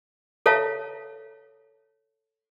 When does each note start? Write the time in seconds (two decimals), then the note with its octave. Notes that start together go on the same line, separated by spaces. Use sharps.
0.46 A4 C#5 E5 F5 A5